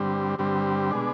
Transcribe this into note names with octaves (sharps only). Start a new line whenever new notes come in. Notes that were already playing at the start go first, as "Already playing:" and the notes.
Already playing: G2 D3 G3 C4
G2 D3 G3 C4
B2 G#3 D4